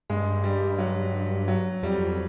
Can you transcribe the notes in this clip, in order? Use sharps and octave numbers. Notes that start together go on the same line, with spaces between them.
G2 G#3
G3
F#3
F#3
F2 G3